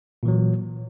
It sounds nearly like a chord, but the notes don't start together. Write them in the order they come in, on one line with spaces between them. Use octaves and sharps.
A#2 E3 F#3